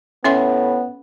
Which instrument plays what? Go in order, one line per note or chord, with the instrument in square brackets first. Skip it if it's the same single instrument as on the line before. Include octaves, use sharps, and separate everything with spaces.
[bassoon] A2 [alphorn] B3 [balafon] C#4 E5 C6